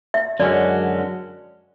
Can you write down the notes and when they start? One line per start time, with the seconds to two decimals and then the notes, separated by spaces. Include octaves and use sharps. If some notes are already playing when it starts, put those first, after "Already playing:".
0.14 E5
0.40 F#2 D3 G#3 C#4 F#4 D5